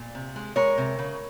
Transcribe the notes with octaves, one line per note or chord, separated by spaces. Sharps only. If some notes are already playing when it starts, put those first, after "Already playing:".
Already playing: A#2
C3
G#3
G#3 A#4 C#5
C3
C#3